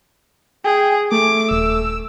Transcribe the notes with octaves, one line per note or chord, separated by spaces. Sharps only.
G#4 G5
A3 D6
D#1 E6